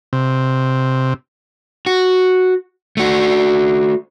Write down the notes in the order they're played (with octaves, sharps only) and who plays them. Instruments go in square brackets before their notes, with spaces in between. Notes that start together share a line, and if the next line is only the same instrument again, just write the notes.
[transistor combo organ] C3
[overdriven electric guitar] F#4
A3 F#4